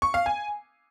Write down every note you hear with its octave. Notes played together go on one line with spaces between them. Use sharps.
C#6
F5
G#5